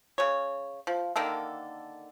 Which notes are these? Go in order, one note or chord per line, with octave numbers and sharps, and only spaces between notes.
C#3 C#5
F3
D3 D#3 A#3 A4